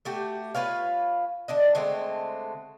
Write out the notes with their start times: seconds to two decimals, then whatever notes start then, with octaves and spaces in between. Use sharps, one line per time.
0.05 A3 F#4 G4
0.55 F4 B4 C#5 F5
1.48 D3 D4 D#5
1.75 D3 G#3 A3 C4